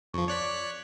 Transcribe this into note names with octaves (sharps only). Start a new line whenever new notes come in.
F2 F3 C#6
C#5 D5 F#6 B6